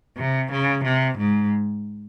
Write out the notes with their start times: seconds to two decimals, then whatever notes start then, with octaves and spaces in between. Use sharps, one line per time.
0.17 C3
0.51 C#3
0.84 C3
1.18 G#2